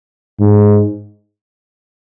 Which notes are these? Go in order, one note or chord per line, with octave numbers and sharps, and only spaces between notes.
G#2